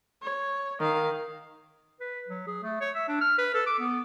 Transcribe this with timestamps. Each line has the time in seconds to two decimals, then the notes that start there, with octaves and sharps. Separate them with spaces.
0.22 C#5
0.80 D#3 F5
2.01 B4
2.28 F#3
2.47 G#4
2.64 A3
2.81 C#5
2.95 E5
3.08 D4
3.21 F6
3.38 B4
3.54 A4
3.67 D6
3.80 B3